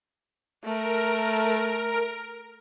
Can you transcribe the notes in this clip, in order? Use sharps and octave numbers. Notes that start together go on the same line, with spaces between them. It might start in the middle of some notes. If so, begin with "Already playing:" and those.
A3 A#4 D7